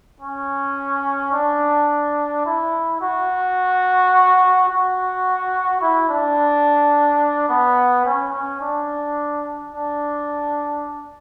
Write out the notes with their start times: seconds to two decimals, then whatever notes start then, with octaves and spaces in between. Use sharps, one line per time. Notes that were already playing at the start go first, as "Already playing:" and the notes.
0.21 C#4
1.32 D4
2.45 E4
3.01 F#4
4.69 F#4
5.81 E4
6.09 D4
7.49 B3
8.05 C#4
8.33 C#4
8.61 D4
9.73 D4